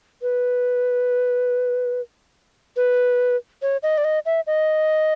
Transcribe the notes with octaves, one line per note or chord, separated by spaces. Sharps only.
B4
B4
C#5
D#5
D5
D#5
E5
D#5